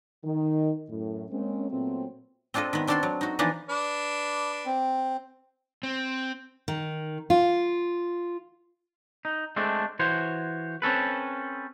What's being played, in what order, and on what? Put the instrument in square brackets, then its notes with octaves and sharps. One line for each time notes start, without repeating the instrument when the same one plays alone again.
[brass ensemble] D#3
F#2 A2
G#3 A#3 C4 C#4
A#2 F#3 A3 B3 C4
[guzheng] C4 D4 F4 A4 D#5
D#3 B3
C4 D4 F#4 A4 G5 C6
F#3
D#4 F#4
E3 F3 B3 D4 D#4
[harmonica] D4 B4
[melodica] C4
[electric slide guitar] C4
[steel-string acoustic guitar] D#3
F4
[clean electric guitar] D#4
G#3 A3 C4 D4
E3 F#4 C5 C#5
C4 C#4 A4 B4